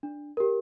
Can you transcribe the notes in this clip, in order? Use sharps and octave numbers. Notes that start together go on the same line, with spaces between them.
D4
G4 A#4